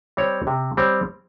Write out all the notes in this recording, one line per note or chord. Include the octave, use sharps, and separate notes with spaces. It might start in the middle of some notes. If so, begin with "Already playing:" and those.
G3 C4 G4 C#5
C3
G3 C4 G4 C#5